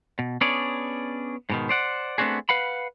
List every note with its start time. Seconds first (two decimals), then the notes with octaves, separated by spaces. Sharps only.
0.19 B2
0.41 B3 C#4 D4 G#4 C#5 D5
1.50 G#2 B2 D#3
1.69 C5 D5 F#5
2.18 A3 B3 C4 D4 F#4 G#4
2.49 B4 F5 F#5 B5